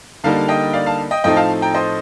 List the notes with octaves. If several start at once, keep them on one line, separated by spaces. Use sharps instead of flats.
D3 G3 A#3 D#4 F5 A5
D#5 G5
D5 F5
F5 A5
D#5 G5
A2 F3 A3 C4 D#4 D#5 G5
F5 A5
G5 A#5
C5 D#5